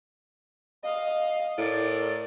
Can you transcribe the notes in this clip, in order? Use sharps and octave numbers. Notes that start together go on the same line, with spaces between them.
D#5 F5
A2 A#4 D5